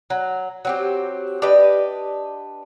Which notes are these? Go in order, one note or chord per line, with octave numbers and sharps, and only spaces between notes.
F#3
F#3 C4 G4
D4 G4 B4 D#5